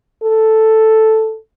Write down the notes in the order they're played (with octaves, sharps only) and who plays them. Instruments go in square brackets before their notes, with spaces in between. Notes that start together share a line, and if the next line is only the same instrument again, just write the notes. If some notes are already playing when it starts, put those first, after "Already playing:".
[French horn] A4